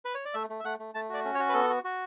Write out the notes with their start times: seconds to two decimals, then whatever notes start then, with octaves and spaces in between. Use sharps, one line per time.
0.05 B4
0.15 C#5
0.25 D5
0.34 A3 E5
0.50 A3
0.60 E5
0.64 A3 F#5
0.79 A3
0.94 A3 A5
1.09 F#4 D5
1.25 C#4
1.34 C#5
1.39 F#4
1.49 B4
1.54 B3 A4
1.70 F#4
1.84 F#4